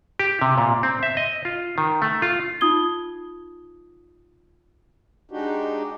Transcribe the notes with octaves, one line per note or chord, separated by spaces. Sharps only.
G4
C3
A#2
C4
E5
D#5
F4
D#3
A3
F4
D#4 F4 D#6 G#6 G7
G#3 D4 D#4 F#4 G4